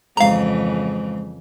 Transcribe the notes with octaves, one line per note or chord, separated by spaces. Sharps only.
F2 G#2 C#3 E3 F5 A#5